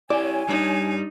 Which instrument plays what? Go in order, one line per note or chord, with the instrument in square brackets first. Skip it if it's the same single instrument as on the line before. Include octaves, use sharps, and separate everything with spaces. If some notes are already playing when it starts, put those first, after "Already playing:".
[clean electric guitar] E4 G4 [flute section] C#5 G#5 [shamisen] D5
[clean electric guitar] G3 D4 [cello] D#4